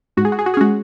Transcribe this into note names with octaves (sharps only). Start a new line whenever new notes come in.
G#2 F#4
G#4
F#4
G#4
F#4
G#4
G#3 C#4 F#4